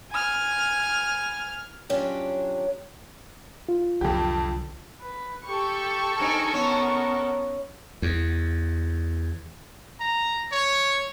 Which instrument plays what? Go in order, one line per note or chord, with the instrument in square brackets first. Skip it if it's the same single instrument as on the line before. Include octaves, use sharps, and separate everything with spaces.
[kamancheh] G#5 F6
[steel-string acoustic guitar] F#3 C#4 D4 F4 G4
[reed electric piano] F4
[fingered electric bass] C2 D3 F#3 [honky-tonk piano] F2 G4
[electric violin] B4
[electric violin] G4 [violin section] A4 C#6
[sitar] G2 C4 D#4 [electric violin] A#4 G#5
[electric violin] B3 A#4 [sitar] C#4
[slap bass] E2
[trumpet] A#5
C#5